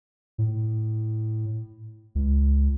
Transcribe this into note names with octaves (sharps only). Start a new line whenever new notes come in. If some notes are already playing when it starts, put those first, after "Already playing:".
A2
C#2